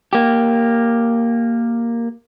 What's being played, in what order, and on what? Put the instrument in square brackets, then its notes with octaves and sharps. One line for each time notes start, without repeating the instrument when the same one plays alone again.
[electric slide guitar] A#3 G4